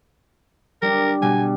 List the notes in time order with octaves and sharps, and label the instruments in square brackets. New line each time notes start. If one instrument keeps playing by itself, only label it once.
[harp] G3 D4 [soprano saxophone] A#4
[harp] B2 G3 [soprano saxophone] G#5